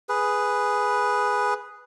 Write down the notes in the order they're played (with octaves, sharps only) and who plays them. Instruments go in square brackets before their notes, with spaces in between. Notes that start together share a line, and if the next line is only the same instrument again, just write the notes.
[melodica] G#4 B4